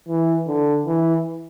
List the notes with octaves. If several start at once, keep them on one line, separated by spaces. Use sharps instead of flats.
E3
D3
E3